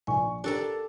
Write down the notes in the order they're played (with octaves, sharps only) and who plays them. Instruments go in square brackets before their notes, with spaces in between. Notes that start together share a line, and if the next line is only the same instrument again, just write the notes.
[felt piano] A#1 D5 C#6 [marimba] G#5
[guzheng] D4 A4 A#5 [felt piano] G4 A#4